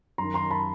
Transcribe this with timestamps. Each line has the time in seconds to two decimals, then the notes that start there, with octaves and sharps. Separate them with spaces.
0.18 F#2 D#3 A#5 C6
0.34 A#5 C6
0.50 A5 B5